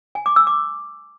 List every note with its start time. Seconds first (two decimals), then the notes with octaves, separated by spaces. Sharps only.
0.15 G#5
0.26 D6
0.36 E6
0.47 D6